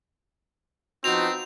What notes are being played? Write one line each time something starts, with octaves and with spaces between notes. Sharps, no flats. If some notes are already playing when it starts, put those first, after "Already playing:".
F3 B3 C4 D#4 F#4 F7